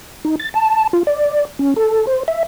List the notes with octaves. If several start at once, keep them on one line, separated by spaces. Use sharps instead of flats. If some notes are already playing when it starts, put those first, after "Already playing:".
D#4
A6
A5
F4
D5
C#4
A4
C5
E5